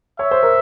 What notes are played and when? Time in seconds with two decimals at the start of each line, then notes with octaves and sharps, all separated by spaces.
0.19 C#5 E5
0.31 C5
0.43 A#4